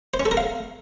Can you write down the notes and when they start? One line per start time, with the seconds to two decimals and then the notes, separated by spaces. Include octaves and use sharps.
0.14 C5
0.20 C#4
0.25 A4
0.31 A#4
0.37 F5